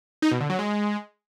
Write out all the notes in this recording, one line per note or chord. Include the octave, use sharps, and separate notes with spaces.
D#4
B2
D3
F#3
G#3